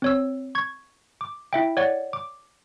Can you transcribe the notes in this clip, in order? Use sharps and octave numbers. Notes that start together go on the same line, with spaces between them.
C4 C#5 E6
C#6 G#6
D6
E4 E5 G5
C#5 D5 F#5
D6